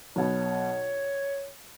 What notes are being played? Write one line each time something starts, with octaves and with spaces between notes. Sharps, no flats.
B1 B2 B3 C#5